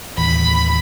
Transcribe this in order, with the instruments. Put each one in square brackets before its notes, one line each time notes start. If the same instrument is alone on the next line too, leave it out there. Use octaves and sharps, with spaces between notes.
[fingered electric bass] D#2 A2 E3 [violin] B5